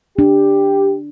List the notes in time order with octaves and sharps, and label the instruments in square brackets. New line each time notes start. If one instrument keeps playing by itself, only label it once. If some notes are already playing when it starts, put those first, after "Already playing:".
[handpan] D4 [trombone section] G4